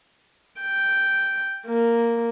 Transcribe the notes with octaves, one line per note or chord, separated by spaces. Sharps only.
G5
A#3